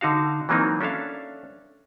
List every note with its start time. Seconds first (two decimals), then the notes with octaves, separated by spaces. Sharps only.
0.01 D3 D#4 F#4 F5
0.49 E3 F#3 A#3 C4 D#4
0.80 C#4 D4 A4 E5 F5